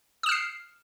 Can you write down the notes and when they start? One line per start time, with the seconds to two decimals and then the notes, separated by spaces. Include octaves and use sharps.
0.23 D#6
0.26 E7
0.29 F6
0.32 C7